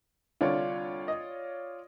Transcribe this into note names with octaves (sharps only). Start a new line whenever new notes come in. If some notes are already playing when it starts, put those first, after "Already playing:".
C2 D3 F4 C#5 D5
D#5